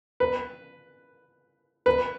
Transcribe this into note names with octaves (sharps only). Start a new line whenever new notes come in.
B4
B4